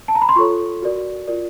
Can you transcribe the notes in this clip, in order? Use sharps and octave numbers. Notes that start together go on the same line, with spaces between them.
A5
A#5
B5
C6
F4 A4 C#5 C#6
F#4 A#4 D5
F4 A#4 D5